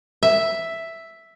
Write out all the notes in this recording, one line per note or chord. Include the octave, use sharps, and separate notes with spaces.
E5